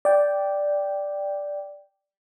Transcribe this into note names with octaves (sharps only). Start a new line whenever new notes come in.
D5 G5